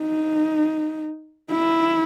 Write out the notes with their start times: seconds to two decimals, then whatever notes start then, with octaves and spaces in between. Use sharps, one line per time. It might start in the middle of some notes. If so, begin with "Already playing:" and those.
Already playing: D#4
1.50 E4